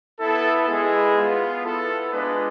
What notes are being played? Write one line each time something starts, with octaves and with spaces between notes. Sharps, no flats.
B3 E4 A4
G#3 B3 E4 G#4
B3 F4
B3 E4 A4
G#3 D4 F4 B4